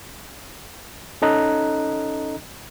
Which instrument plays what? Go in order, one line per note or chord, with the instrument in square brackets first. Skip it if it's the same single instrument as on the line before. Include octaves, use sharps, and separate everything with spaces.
[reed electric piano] C#4 D#4 A4 D#5 A#5 F#6